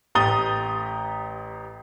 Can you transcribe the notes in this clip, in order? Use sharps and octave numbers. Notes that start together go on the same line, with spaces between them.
A1 G4 A#5 D#6 A6 G7